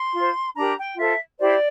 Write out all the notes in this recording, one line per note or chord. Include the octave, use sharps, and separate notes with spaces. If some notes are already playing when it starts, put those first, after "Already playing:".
Already playing: C6
F4
C5
D4 G4 A#4 A#5
G5
F4 A4 C5 E5
E4 G4 C5 D5